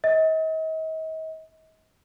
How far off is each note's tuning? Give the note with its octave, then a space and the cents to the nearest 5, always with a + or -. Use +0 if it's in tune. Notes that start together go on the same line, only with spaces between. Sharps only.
D#5 +40